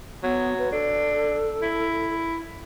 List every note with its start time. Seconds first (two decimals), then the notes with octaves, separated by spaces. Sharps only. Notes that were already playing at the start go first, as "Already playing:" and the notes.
0.23 F#3 B3
0.59 B4
0.72 D4 A4
1.62 E4